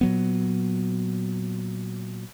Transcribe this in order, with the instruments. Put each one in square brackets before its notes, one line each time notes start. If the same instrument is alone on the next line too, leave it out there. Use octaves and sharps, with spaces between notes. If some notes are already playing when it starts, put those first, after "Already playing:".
[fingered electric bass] A#2 F#3 B3